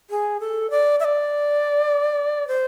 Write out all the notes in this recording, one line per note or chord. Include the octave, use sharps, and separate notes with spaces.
G#4
A4
D5
E5
D5
C5